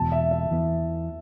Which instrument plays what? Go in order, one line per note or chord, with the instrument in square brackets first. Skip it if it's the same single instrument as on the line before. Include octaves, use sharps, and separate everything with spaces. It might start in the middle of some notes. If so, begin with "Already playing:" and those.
Already playing: [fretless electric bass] E1 E2 B2 [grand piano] A5
[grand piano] E5
E5
[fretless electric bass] E2 E3 B3